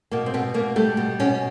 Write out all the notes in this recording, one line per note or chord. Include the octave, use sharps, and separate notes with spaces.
B2 A#3
C4
B2 B3
B2 A#3
G3 A3
B2
B2 C#4